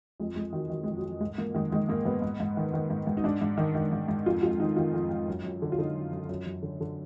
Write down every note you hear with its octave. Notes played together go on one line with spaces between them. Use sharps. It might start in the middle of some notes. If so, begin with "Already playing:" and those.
F2 G#3
F2 G#3
D#3 F#3
D#3 F#3
F2 G#3
F#3
F2
G#2 G#3
G#2 A#3
D#3 G#3
D#3 G#3
G#2 A#3
G#2 B3
G#2
G#2
D#3
D#3
G#2
G#2
D#4
G#2 D4
G#2
D#3
D#3
G#2
G#2
F2 F4
F2 F4
D#3 D#4
D#3 F4
F2
F2
F#2
F#2
D3
F4
D3 D#4
F#2
F#2
F#2
F#2
D3
D3